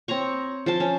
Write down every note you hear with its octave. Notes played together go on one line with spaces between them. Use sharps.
C4 C#5 A#5 C#6
F3 C5 A5
C#4